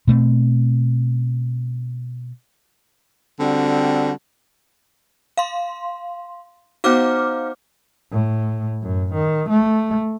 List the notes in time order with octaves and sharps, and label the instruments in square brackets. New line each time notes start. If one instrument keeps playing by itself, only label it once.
[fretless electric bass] B2 A3 A#3 C4
[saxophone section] D3 G3 C4 F#4
[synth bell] F5 C6
[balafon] B3 F#4 [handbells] D#4 C5 F#5 [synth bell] F5 D6 F6
[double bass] A2
F#2
D#3
A3